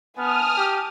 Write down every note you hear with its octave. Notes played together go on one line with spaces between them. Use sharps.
B3 G#5 A5 D#6 F6
G4